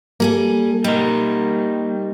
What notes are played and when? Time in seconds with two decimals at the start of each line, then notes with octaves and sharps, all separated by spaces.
0.20 G3 A#3 G#4 A4
0.84 G3 D#4 A#4